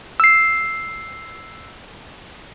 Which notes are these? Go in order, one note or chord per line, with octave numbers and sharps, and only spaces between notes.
E6 C7